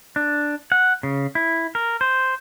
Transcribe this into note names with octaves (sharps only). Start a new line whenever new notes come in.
D4
F#5
C#3
E4
A#4
C5